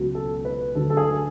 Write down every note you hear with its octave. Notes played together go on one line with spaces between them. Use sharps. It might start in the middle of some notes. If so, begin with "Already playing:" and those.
Already playing: C#2 B2 F#3
A4
B4
D2 D3 F#3 A4
A4
G#4